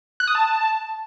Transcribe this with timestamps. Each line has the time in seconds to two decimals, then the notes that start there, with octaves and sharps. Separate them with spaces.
0.20 F#6
0.28 D#6
0.35 A5